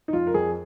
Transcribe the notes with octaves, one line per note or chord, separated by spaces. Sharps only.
D#4
F2 F4
A#4
F2 G#4